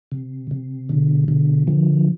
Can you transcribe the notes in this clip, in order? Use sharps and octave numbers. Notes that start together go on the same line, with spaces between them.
C3
C3
B2 D3
B2 D3
D3 F3